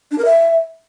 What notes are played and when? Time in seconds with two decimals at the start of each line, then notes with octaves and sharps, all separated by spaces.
0.11 D4
0.18 A#4
0.25 E5